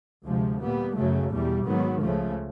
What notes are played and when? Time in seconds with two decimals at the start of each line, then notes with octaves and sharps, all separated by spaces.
0.25 D2 C3 F3 G#3
0.60 A#2 G3 B3
0.95 F#2 C#3 F#3 A3
1.31 E2 B2 G3
1.66 G#2 D#3 F#3 B3
2.01 C#2 C#3 F3 A3